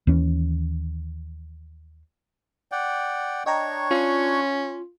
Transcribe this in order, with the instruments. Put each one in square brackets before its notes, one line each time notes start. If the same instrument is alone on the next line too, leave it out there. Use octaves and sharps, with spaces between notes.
[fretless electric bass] D#2 E3 C#4
[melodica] D5 F#5 G5
[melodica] D4 C#5 C#6 [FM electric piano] D#5 G5 A#5
[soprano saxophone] C#4 [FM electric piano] F4 C6